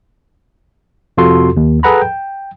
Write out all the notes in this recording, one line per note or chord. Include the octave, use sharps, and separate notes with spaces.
F2 C3 F4 F#4 A4 C6
D#2
G#4 A4 B4 F#5 A#5 B5
G5